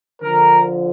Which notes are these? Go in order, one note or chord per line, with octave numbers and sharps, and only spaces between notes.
D3 F3 A#4